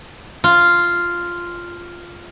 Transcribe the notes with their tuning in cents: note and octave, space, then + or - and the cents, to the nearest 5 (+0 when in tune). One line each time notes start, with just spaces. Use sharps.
F4 -5